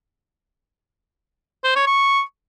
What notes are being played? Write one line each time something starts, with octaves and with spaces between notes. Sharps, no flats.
C5
C#5
C#6